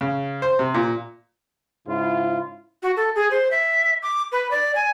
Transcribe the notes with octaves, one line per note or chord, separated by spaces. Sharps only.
C#3
C5
C3
A#2
G#2 C#3 E4 F4
F#4
A4
G#4
C5
E5
D6
B4
D5
G#5